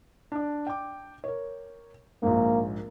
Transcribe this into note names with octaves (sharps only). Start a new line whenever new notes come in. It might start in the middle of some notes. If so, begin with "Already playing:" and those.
D4 D5
G5 D6
A#4 C#5
A#1 G#2 A#3